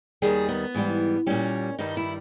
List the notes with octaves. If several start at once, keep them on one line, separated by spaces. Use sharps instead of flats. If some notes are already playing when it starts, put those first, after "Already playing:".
D#2 D#3 G3 G#4
B3
G#2 E3 G3
A#2 G3 C#4
G2 D#3 G3 D#4
E4